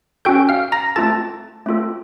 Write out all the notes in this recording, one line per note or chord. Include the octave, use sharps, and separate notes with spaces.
C#4 F#4 A4 G5 G6
F5 F6
A#5 A#6
A3 C4 F4 A4 A5 A6
A3 C4 F4 A4